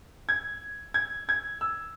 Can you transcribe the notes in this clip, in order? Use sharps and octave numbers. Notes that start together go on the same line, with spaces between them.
G#6
G#6
G#6
E6